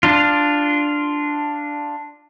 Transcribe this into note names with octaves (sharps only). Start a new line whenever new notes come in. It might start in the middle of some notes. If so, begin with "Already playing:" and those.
D4 F4